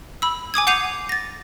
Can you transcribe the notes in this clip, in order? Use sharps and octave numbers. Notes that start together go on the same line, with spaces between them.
B5 E6
G#5 D6 D#6 G#6
F#5 D6 G6 C7 D#7 F7
A6 A#6